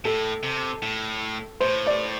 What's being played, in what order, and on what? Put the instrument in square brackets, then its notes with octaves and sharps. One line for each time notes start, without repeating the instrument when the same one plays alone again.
[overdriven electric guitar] A2 [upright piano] A4
[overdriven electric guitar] C3
A2
[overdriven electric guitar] A2 [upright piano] C5
[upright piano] D5